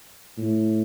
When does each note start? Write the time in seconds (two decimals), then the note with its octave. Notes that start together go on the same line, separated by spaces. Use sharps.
0.38 A2